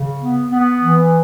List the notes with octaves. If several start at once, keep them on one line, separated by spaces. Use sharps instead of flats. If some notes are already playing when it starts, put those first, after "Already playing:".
Already playing: C#3
B3
B3
E3